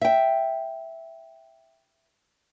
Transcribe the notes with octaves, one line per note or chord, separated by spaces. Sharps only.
E5 G5